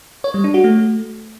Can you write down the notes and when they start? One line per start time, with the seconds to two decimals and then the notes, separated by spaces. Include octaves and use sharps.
0.24 C#5
0.34 G3
0.44 D4
0.54 F#4
0.64 A3